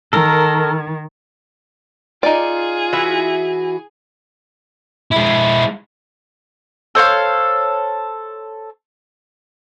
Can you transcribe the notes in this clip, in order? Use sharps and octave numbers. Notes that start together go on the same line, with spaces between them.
D#3 A4 A#4
D#4 F4 G#4 D5
E3 F#4 E5
G#3 E4
A4 C5 C#5 F5